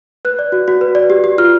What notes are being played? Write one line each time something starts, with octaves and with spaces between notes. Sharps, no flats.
B4 F#6
D5
F#4
F#4
B4
D5
G4
G4
F4 F6